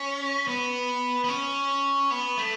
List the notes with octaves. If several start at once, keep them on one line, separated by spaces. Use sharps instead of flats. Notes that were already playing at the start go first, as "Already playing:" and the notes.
Already playing: C#4
B3
B3
C#4
B3
A3